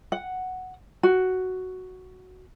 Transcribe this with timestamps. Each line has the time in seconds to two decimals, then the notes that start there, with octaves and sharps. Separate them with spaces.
0.12 F#5
1.03 F#4